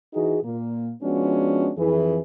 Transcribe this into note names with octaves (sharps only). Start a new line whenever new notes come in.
E3 D#4 F#4 G#4
A#2 A#3
F3 G#3 B3 C#4 D4 F#4
F2 E3 G#4